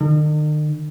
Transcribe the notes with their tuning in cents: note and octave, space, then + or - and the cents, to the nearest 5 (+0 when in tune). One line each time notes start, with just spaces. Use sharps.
D#3 -45